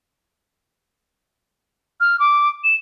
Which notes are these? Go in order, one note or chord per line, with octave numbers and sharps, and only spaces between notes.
F6
D6
E7